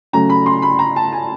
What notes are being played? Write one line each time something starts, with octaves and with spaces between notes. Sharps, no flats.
C#3 F#3 A3 C#4 A#5
B5
C6
B5
A#5
A5
G#5